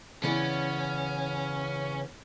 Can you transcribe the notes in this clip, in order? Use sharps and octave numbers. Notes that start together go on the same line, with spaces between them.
C#3 E3 B3 C#4 D5